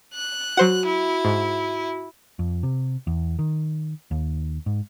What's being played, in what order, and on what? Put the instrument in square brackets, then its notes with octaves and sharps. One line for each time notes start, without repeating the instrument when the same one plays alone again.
[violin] F#6
[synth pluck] F#3 C5 F#5 [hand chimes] F#4
[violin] E4
[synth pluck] G#2
[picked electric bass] F2
C3
E2
D#3
D#2
G#2